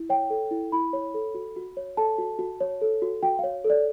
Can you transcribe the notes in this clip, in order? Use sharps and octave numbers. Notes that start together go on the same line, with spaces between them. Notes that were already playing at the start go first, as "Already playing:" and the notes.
Already playing: E4
C#5 G5
A4
E4
E4 B5
C#5
A4
F#4
F#4
C#5
A4 A5
F#4
F#4
C#5
A4
F#4
F#4 G5
C#5 F5
A4
D5